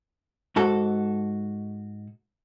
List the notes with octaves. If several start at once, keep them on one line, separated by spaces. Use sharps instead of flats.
G#2 F#4 A4